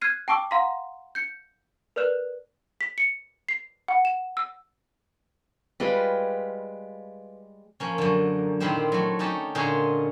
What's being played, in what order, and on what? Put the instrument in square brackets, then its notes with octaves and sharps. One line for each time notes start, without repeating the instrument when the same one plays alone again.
[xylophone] F6 F#6 G#6 C7 D#7
G5 A5 C#6 D6 E6
F5 F#5 A#5 C6 B6
G6 C#7
A#4 B4 D5 F6 F#6 E7
B6
C#7
C7
F#5
E7
E6
[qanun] G3 G#3 F4 B4
[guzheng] F3 A#3 C#4
F#2 D3
A#2 D#3 C4 E4 G4 C5
F#3 A3
C#4 D#4 G4 A5
A#2 D3 C#4 D#4 F4 G#4